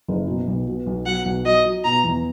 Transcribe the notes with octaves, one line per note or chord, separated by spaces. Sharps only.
F#1
B2
B1
B2
B1
F#3 F#5
B1
F#3 D#5
F#3
B2 A#5
E2